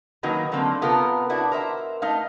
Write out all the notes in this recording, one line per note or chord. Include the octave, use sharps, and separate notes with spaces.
D#3 F#3 A#3 D#4 F#4 B4
D3 F#3 A3 A#3 C4
C3 B3 F4 A4 A#4
D4 E4 F#4
A#4 C5 E5
A3 D#4 F5